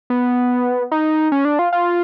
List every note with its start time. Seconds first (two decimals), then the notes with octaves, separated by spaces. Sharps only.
0.10 B3
0.92 D#4
1.32 C#4
1.45 D4
1.59 F4
1.73 F4